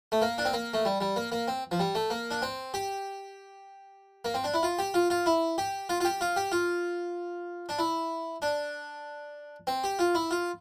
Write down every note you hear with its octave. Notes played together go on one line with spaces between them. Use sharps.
A3
A#3
D4
C4
A#3
A3
G3
G3
A#3
A#3
C4
F3
G3
A3
A#3
D4
C4
G4
A#3
C4
D4
E4
F4
G4
F4
F4
E4
G4
F4
F4
G4
F4
G4
F4
D4
E4
D4
C4
G4
F4
E4
F4